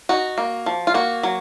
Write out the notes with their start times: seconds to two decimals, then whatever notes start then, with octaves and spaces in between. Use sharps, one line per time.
0.09 D#4 F#4
0.38 A#3
0.66 F3
0.87 F4
0.94 A#3 F#4
1.23 F#3